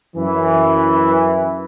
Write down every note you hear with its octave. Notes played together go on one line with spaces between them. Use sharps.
F#2 E3